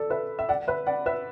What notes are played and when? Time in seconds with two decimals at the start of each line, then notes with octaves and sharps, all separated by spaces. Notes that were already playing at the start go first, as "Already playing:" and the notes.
Already playing: A4 D5
0.10 B4 E5
0.39 E5
0.49 D5 F#5
0.67 B4 E5
0.87 D5 F#5
1.06 B4 E5